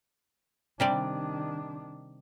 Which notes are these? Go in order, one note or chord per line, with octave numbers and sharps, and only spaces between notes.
C3 D#3 G3 D4 D5